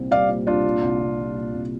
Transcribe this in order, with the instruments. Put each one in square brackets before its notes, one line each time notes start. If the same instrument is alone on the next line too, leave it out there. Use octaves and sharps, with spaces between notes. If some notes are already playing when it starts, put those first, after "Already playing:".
Already playing: [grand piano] C2 A#2 C4
[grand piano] G3 [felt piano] D5 F5
[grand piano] A#2
[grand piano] C2 [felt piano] D4 F4
[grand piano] A#2
C2
C2
G3
A#2
C2